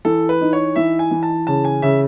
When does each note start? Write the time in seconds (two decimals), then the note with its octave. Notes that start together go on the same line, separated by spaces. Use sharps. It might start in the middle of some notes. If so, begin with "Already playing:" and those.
0.05 E3 A4
0.29 B4
0.41 D#4
0.53 C#5
0.76 E3 E5
0.99 G#5
1.11 E3
1.23 A5
1.47 C#3 A5
1.65 G#5
1.82 C#3 E5